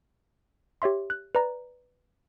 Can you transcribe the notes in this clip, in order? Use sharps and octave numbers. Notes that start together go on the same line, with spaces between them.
G4 C#5 E5 C6
F#6
B4 D5 A#5